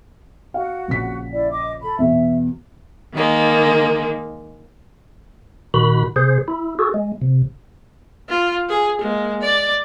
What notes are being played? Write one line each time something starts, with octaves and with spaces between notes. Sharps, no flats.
F#4 F5 F#5
A#1 C#3 B6
E4 D5
D#5 D6
A4 B5
E2 B2 E5
D#3 G#3 A#3
A#2 D#3 F#4 B5
C3 G#4 C5
E4
F#4 G#4 A4
G#3
C3
F4
G#4
G#3 A#3
D5